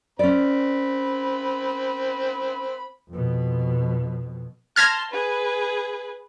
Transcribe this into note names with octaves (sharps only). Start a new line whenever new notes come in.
C4 C#4 D5 B5
F2 B2
A5 C6 F6 G#6 A#6
G#4 B4